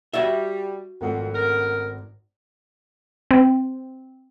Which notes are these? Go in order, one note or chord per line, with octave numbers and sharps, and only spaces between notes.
G3 F#4 D5 E5
G#1 F2 A3 F#5
C#3 A#4
C4